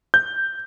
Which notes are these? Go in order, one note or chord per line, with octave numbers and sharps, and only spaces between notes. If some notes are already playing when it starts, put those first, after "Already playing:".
G6